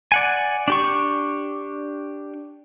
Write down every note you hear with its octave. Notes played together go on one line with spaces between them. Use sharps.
D5 F#5 G#5
D4 G4 C#6